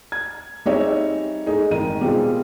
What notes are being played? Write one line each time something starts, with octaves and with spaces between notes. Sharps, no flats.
G#6
G3 C4 D#4 G#4 C#5 E5
G#3 A3 D#4 G#4
G#1 D#3 D#7
B2 G3 G#3 C4 F4